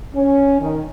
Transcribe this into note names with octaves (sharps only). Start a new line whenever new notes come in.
C#4
D#3